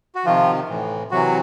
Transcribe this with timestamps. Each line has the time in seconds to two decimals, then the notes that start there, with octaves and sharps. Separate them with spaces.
0.15 F#4
0.25 C3 D#3 F3 F4
0.69 A2 E3
1.11 C3 E3 F#3 F#4